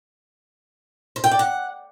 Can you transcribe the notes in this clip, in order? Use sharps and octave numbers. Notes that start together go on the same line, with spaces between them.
C5
G5
D5
F#5